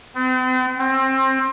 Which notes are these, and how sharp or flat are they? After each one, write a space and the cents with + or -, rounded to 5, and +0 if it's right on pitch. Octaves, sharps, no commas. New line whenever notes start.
C4 -40
C4 +25